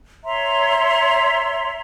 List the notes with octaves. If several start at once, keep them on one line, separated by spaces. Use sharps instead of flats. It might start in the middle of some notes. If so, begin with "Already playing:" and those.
C#5 E5 A#5 C6